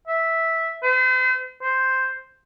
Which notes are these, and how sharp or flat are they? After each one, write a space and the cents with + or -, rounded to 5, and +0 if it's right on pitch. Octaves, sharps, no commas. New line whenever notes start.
E5 -5
C5 -40
C5 +0